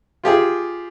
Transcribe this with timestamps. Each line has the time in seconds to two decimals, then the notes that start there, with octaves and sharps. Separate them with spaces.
0.24 F4 G4 G#4